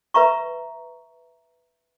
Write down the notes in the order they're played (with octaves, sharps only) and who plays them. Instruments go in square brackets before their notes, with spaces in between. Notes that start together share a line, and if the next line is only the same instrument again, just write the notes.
[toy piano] B4 E5 A#5 C#6